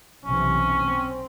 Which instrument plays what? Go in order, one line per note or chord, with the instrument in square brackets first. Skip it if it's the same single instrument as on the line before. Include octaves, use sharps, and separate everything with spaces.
[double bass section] B1 C3 E3 [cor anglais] C#4
[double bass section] C4